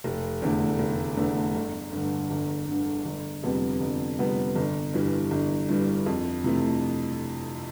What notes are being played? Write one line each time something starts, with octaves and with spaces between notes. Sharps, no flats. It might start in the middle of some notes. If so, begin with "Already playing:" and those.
F1
E2 D3 A3
F1
E2 D3 A3
G1
G2
D3
G1
G2 D3
G1
F2 C3 G3 B3
G1
F2 C3 G3 B3
G1
G2 E3 G3
G1
G2 E3 G3
F2
C3 E3 A3